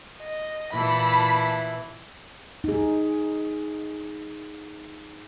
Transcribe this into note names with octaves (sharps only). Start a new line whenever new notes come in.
D#5
A#2 E3 E4 A5 B5
D#4 G#4